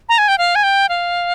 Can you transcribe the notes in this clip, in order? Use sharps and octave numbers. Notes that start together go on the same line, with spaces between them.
A#5
G#5
G5
F5
G#5
G5
F5